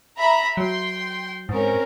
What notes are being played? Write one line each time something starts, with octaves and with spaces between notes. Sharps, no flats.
E5 A#5 B5
F#3 G5 C6
G#2 C4 C#4 A#4